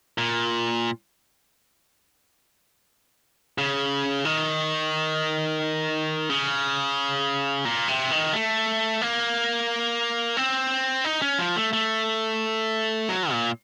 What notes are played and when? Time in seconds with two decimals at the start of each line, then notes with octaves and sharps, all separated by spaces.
0.18 A#2
3.58 C#3
4.25 D#3
6.29 C#3
7.65 A#2
7.88 C3
8.11 D#3
8.33 A3
9.02 A#3
10.37 C4
11.05 D#4
11.22 C#4
11.38 F3
11.56 A3
11.73 A3
13.09 F#3
13.31 A#2